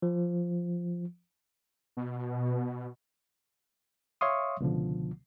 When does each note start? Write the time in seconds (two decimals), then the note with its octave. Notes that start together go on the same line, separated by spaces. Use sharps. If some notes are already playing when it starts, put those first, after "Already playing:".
0.02 F3
1.97 B2
4.21 C#5 E5 F5 C6 C#6 D#6
4.60 C#2 B2 D3 F3